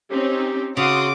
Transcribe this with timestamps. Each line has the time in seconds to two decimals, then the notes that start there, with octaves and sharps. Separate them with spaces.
0.11 C4 C#4 D#4 G4
0.77 C#3 F#4 F#5 C6 D6 D#6